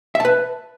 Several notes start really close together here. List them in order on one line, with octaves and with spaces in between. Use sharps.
E5 A5 B4